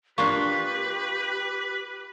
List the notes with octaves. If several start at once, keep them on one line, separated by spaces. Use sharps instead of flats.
A#3 D4 F4 G4 B4 C#6